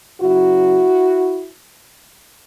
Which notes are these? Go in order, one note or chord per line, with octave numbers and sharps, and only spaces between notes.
F#2 C#3 F#3 E4 F#4